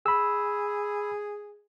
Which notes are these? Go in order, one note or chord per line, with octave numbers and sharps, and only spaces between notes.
G#4 B5 E6